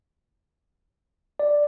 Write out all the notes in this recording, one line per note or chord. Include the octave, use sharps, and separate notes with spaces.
D5